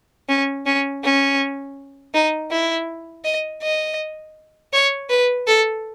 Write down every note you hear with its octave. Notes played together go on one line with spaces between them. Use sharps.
C#4
C#4
C#4
D#4
E4
D#5
D#5
C#5
B4
A4